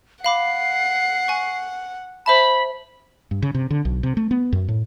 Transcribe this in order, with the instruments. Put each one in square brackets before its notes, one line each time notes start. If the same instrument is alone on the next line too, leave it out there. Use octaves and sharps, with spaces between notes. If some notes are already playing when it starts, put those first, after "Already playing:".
[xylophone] F5 B5 D6 [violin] F#5 [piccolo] C7
[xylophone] G#5 C#6
[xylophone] C5 E5 A5 [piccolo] B5
[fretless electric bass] G2
C#3
C3
D3
B1
C3
A3
B3
F#2
A2